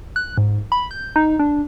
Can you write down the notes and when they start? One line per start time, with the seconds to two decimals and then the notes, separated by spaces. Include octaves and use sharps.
0.16 F#6
0.38 G#2
0.72 B5
0.91 G6
1.16 D#4
1.39 D4